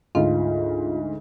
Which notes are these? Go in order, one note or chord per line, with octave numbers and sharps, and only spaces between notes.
D2 G#2 F4